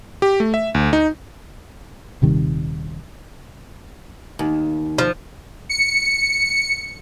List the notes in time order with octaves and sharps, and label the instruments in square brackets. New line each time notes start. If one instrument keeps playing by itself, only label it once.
[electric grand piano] G4
A3
E5
D2
D#4
[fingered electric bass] D#1 C3 D#3 G3
[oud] D#2
[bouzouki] F3
[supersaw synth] C#7